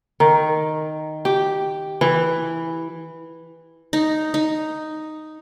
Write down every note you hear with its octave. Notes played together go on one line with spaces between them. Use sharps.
D#3
G4
E3
D#4
D#4